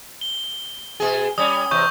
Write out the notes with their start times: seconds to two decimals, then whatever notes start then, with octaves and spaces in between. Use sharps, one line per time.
0.21 G7
1.00 B2 G#4
1.38 G3 C#4 D#6
1.71 E2 C3 C#6 G6